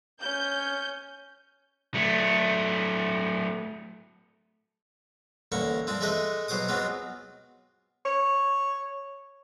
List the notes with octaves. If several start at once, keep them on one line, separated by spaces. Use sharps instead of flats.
C#4 G6
F#3 A3
A1 D3 A#3 C#6
F3 C4 D4
G#3 A3 G#4 B4 D#5
B2 F#3 C5 D6 D#6
F#3 G#3 B3 C4 F4
C#5